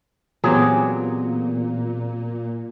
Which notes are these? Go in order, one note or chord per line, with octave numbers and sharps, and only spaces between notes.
A#2 E3 F#3 B3 C4 G4 G#4